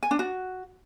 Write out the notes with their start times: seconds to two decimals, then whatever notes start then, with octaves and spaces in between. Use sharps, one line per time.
0.03 G#5
0.11 D4
0.19 F#4